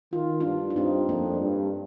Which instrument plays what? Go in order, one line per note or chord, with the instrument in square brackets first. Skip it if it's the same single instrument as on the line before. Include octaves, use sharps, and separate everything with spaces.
[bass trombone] D#3 [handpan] F4
[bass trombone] G2 [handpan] D4 F4
[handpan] F4
[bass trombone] G2 [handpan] C4 D#4
[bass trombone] F2 [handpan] A#3 D4
[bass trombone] G2